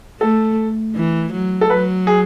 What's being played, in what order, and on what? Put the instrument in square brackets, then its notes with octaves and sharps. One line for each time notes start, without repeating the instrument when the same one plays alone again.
[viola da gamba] A3 [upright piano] A4
[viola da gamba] E3
F#3
[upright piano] A4
[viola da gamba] F#3 [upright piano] B4
[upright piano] G#4